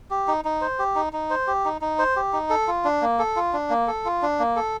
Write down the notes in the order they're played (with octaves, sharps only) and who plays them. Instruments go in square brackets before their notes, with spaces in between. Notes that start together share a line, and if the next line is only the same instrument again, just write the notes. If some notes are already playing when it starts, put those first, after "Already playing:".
[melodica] G4
D#4
D#4
C5
G4
D#4
D#4
C5
G4
D#4
D#4
C5
G4
D#4
A4
F4
D4
A#3
A4
F4
D4
A#3
A4
F4
D4
A#3
A4